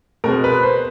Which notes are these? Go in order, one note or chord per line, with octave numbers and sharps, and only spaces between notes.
B2 G#3 C4 A#4
B4
C5